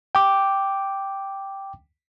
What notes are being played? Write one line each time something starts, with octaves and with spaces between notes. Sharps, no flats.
G5 D6